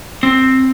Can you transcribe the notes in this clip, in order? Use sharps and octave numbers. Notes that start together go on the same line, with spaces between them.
C4